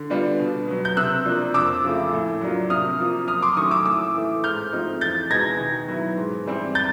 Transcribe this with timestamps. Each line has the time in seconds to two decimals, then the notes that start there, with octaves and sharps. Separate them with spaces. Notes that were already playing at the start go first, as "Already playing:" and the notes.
Already playing: D3
0.10 G3 B3 D4 F4
0.39 B2
0.68 F#3 B3
0.85 G6
0.97 C3 E6 F#6
1.26 F3 A#3 D4
1.54 F2 D6 E6
1.84 C#3 F3 A3
2.12 A2
2.41 F#3 A#3 D4 F4
2.70 C3 D#6 F6
2.99 F3 A#3
3.28 F#2 D#6 F6
3.42 C6 D6
3.57 D#3 F#3 A3 C#4 C#6 D#6
3.71 D6 E6
3.86 A2 D6 E6
4.14 E3 A3
4.44 G#2 F6 G6
4.73 F3 A3 C4 D#4
5.01 E2 G6 A6
5.30 B2 G#3 B3 D#4 G#6 A#6
5.60 D#3
5.88 F#3 B3 E4
6.17 G#2
6.46 E3 G3 C4 E4
6.75 G6 A6